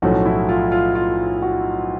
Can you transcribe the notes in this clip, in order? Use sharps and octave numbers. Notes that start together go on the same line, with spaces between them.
B1 A2 F3 A3 C#4 F#4
E4
F4
F4
F4
F#4